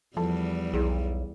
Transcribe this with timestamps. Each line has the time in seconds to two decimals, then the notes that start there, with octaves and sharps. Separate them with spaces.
0.17 E2 F3 G3 A4 A5
0.73 B1 E4 G#4